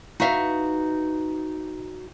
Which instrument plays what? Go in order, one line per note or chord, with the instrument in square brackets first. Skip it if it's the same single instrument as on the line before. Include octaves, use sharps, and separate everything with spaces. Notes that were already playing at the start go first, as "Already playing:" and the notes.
[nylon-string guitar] D#4 F#4 B4 E5 F5